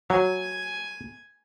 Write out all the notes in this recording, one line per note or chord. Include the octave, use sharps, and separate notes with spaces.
F#3 G#5